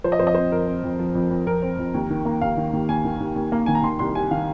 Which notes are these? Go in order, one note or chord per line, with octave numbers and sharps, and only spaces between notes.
F3 C5
D#5
F2 C5
D#5
C4 C5
F2 A#4
C4
F2
F3
F2
F2
F2 A#4
C4
F2
D#2
D#3
A#3
D#2 F5
D#3
D#2
D#2 G#5
D#3
D#2
D#2
A#3
D#3 G#5
A#5
D#3 C6
C2 C6
C3 G#5
D#3 F5